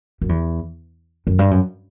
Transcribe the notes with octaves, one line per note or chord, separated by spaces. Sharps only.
F#2
E2
F#2
G2
F#2